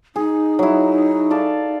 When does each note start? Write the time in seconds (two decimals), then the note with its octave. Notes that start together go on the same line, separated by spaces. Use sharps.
0.16 D#4 G#4
0.59 F#3 E4
1.31 A4 D5 F5